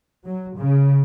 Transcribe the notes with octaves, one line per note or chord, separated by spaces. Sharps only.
F#3
C#3